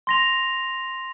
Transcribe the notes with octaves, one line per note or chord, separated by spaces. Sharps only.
C6 A#6 F7